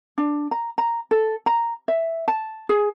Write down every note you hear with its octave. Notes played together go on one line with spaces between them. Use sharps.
D4
A#5
A#5
A4
A#5
E5
A5
G#4